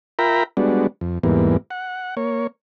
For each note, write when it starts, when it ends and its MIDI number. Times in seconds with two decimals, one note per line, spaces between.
0.19 0.43 65
0.19 0.43 70
0.19 0.43 76
0.19 0.43 79
0.19 0.43 82
0.19 0.43 83
0.57 0.87 55
0.57 0.87 56
0.57 0.87 59
0.57 0.87 62
0.57 0.87 66
1.01 1.19 41
1.23 1.57 40
1.23 1.57 44
1.23 1.57 52
1.23 1.57 55
1.23 1.57 58
1.23 1.57 59
1.70 2.15 78
2.17 2.47 58
2.17 2.47 73